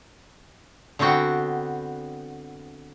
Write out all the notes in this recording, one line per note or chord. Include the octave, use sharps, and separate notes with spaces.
D3 B3 C4 F#4 G5